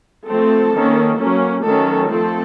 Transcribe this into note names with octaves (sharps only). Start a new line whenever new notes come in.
F3 A3 C4 A4
D#3 A#3 C#4
F#3 A#3 C#4
D#3 F#3 A3 C#4 A4
F3 A3 C4 A4